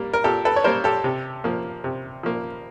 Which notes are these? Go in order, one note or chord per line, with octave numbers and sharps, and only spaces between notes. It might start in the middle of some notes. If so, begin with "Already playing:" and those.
Already playing: G3 A#3
A#4
A#2 G4 A4
A4 B4
C#5
G3 A#3 A#4 C5
G4 A4
C3
F3 A#3
C3
F3 A#3